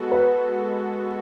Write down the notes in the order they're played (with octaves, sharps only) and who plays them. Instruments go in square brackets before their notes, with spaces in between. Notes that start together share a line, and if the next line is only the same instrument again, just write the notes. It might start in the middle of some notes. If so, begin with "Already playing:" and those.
Already playing: [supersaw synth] G#3 B3 F#4 A4
[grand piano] B4